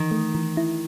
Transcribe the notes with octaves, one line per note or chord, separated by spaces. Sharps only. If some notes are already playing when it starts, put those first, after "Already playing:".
Already playing: D#3 E3
A3
E3
E4